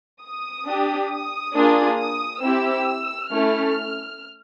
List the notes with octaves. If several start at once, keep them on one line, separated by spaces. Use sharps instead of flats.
D#6
D4
G4
D#6
A#3 D4 F4 G#4
D#6
C4 E4 G4 E6
A3 C#4 E4 A4 F6